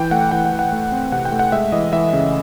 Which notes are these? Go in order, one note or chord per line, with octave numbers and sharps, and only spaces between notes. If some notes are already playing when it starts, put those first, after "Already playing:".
Already playing: E3 G5
A3 F#5
E3 G5
F#5
E3
F#5
A3
C4
C3 F#5
G5
A3
F#5
G#3 E5
E3 D#5
E3 E5
C#3